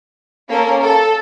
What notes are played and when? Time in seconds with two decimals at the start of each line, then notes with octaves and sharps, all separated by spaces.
0.49 A#3 C#4 A4 A#4
0.83 A4